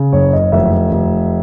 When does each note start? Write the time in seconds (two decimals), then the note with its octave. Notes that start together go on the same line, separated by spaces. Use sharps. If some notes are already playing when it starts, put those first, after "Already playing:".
Already playing: C#3
0.13 F#1 C#5
0.33 D#5
0.52 F1 E5
0.92 F1